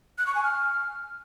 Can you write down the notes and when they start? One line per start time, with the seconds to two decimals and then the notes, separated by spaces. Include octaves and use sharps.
0.18 F#6
0.26 C#6
0.35 G#5
0.43 F6